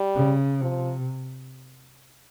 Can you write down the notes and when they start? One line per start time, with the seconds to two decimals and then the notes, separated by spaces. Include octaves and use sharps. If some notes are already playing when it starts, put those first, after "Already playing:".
Already playing: G3
0.16 C#3
0.61 C3 F3